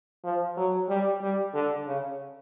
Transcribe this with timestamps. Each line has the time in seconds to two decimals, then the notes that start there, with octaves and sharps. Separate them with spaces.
0.24 F3
0.57 F#3
0.89 G3
1.22 G3
1.54 D3
1.86 C#3